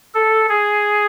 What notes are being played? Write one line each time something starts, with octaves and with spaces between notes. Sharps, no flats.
A4
G#4